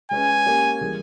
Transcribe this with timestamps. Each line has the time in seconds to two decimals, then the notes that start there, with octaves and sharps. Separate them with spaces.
0.11 G#3 C#4 G#4 B4 G#5
0.46 A#3 C#4 G4 A#4
0.81 E3 G3 A#3 E4 G#4